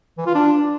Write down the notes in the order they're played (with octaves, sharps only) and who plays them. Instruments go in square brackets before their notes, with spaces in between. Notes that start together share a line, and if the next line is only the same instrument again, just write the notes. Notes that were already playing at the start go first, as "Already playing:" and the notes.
[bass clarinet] E3
F4
D4